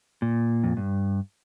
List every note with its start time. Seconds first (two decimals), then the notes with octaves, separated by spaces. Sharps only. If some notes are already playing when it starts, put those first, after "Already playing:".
0.22 A#2
0.64 F2
0.77 G2